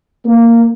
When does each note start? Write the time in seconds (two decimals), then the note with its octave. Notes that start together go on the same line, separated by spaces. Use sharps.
0.25 A#3